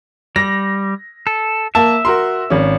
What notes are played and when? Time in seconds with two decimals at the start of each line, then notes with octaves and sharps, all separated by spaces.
0.36 G3 A#6
1.27 A4
1.75 A#3 E5 A5
2.05 F#4 A#4 C6
2.50 G#1 C#4